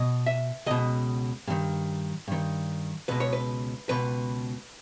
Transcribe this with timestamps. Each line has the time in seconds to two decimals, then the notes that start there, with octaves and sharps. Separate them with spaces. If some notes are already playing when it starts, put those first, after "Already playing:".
Already playing: B2 D#5
0.26 E5
0.66 C#2 B2 D#5
1.47 G2 D#3
2.28 G2 D#3
3.08 C#2 B2 B4
3.20 C#5
3.33 B4
3.89 C#2 B2 B4